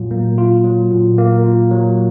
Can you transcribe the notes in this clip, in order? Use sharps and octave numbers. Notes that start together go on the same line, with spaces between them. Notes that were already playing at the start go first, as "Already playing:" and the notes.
Already playing: A#2 F#3 F4
A#3
F4
F#3
A#2
A#3
F4
F#3